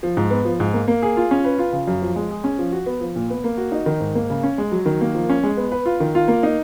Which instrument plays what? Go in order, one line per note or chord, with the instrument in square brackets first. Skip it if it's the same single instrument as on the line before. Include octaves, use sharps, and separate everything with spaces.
[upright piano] F3
G#2
B3
F3
G#2
A#3
A#3
G#4
F4
C#4
B4
F4
C#3
F#2
F3
G#3
G#4
C#4
F3
F#4
B3
F3
A#2
B3
A#3
F#4
D#4
D#3
G#2
A#3
C#3
C#4
G#3
F#3
D#3
A#3
F3
C#4
G#3
B3
B4
F4
D#3
F4
A#3
D#4